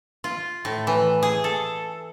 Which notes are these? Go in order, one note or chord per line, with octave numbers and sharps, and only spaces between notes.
F4
A2
E3
G#4
A4